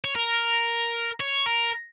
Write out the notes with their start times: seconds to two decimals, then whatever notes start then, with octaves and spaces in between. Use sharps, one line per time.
0.04 C#5
0.16 A#4
1.21 C#5
1.47 A#4